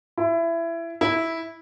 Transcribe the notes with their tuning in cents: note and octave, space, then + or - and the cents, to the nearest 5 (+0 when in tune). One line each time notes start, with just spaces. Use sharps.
E4 +20
E4 -10